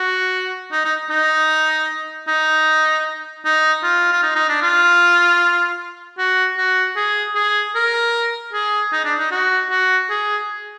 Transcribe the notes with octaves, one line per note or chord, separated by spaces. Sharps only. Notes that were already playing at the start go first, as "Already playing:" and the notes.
Already playing: F#4
D#4
D#4
D#4
D#4
D#4
F4
F4
D#4
D#4
D4
F4
F#4
F#4
G#4
G#4
A#4
G#4
D#4
D4
D#4
F#4
F#4
G#4